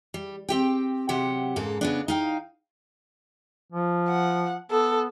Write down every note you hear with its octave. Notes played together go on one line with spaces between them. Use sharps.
G3
C4 G4 G5
C3 F#3 G4 F#5
G#2 C#3 A#3 A4
C#3 B3 D4
D#4 F5 G5
F3
F#5
B3 A4